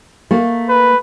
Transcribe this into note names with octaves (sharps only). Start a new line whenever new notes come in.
A3 A#3
B4